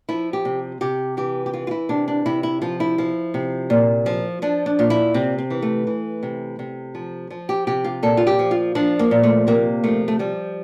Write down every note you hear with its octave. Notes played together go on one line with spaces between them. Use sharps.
F3 E4
G4
C3
C3 G4
E3 G4
G4
E3 F4
F4
E4
C3 D4
D4
C3 E4
E4
F3 F4
E4
F3
C3
A#2
F3
F3 D4
D4
A#2 F4
E4
C3 C4
C4
E3
A3
E3
C3
C3
F3
F3
G4
C3 G4
F4
A#2 A4
F4
G4
F3
F4
F3 D4
A#3
A#2
A3
C3 A#3
F3 A3
A3
F3 G3